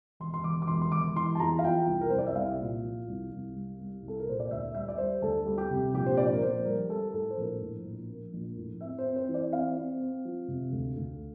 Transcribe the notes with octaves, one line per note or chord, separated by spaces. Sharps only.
E1 C6
C6
E1 D6
D6
E1 C6
C6
E1 D6
E3 C6
A5
E2 A#5
F5
F3 G5
C2
A#4
C2 C5
D5
E5
C2 F5
A#2
F3
C2
C2
G3
G3
C2
A4
A#4
A#2 C5
D5
D2 E5
G3 E5
D5
G3 C5
D2 A4
G3
G4
C3
A#1 G4
C5
A#1 D5
A#4
A#1 C5
G3 A#4
G3 A4
A2 A4
C5
A#1 A#4
A2
A#1
A#3
A#1
A2
C4 E5
C5
C4
C5
E3
D5
C4 F5
C4
C4
F3
C3
D2
D2